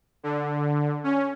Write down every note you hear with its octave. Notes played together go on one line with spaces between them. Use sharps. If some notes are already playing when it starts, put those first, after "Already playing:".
D3
C#4